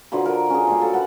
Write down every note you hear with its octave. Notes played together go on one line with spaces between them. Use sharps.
D3 F3 F#3 B4
F3 A#4
C#4 G#4
F3 G3 A#3
F#3 A4 F5
B4 F#5 A5